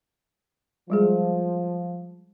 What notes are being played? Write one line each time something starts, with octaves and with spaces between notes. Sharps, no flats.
F3 G3 G#3 G#4